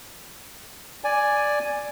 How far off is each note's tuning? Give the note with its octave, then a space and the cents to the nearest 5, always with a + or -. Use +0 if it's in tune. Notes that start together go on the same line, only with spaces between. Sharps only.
D5 +0 G#5 +0